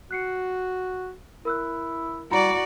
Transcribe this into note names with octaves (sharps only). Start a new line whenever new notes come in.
F#4 F#6 C7 C#7
E4 A#4 E6 F#6
G3 E4 F#4 D5 A#5 B5